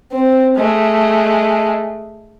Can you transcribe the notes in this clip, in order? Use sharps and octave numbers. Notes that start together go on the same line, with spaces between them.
C4
G#3 A3